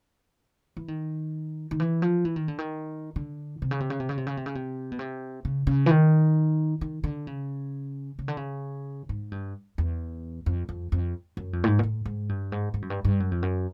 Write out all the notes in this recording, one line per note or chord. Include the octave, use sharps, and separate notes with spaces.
E3
D#3
D#3
E3
F3
E3
D#3
D3
D#3
D3
C3
C#3
C3
C#3
C3
C#3
C3
C#3
C3
C#3
C3
B2
C3
C#3
C#3
E3
D#3
D#3
D3
C#3
C#3
D3
C#3
G#2
G2
E2
F2
F2
F2
F#2
F2
A2
G#2
A#2
A2
G#2
G2
G#2
G#2
F#2
G2
G2
F#2
F2
F#2